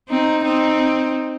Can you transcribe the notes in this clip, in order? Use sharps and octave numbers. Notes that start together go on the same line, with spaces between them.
C4 D#4
C4 D#4